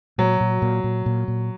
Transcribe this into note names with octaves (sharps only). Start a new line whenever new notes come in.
A#2 F#3
A#2
A#2
A#2
A#2
A#2